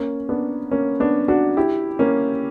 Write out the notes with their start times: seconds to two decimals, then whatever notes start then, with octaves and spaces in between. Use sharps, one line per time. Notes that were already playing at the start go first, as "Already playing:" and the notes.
Already playing: A#3 C#4
0.29 B3 D4
0.71 A#3 C#4
1.00 B3 D4
1.28 D4 F#4
1.57 E4 G4
1.99 A#3 C#4